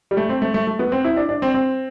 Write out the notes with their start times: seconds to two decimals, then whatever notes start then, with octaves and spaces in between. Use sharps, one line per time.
0.11 G3
0.17 A3
0.29 C4
0.42 A3
0.54 A3
0.67 A3
0.79 B3
0.92 C4
1.05 E4
1.17 D4
1.29 D4
1.42 C4
1.54 C4